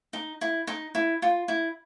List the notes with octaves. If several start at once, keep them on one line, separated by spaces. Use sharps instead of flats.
D#4
E4
D#4
E4
F4
E4